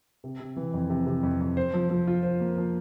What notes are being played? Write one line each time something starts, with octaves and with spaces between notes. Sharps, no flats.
C3
C3
E3
F2
C3
C3
F2
F2
C5
F3
F3
F4
C5
A#3
F3